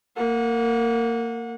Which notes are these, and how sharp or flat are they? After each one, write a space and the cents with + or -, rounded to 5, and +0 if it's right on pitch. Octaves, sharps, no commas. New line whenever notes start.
A#3 -20 F#5 -30